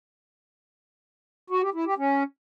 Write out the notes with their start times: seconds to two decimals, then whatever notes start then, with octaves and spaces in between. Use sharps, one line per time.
1.50 F#4
1.62 G4
1.74 E4
1.86 G4
1.98 C#4